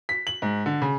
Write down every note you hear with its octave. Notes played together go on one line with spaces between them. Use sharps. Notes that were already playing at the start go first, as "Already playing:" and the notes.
B6
F#7
G#2
D3
C#3